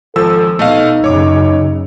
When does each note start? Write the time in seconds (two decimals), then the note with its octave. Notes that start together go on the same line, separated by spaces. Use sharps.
0.16 G#1 F3 A4 E6
0.59 B2 A3 D#4 D#5 F5
1.04 F#2 C#3 C#5 D6